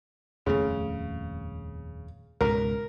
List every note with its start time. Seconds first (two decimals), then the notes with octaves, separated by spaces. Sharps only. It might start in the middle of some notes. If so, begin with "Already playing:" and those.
0.46 D#1 F2 C#3 A3
2.41 C#2 G#2 B2 A#4